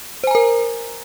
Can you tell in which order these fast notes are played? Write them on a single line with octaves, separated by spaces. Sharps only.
C5 G#5 A#5 A#4